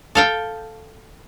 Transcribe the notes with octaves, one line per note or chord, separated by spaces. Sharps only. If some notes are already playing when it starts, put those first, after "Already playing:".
A4 F5 G5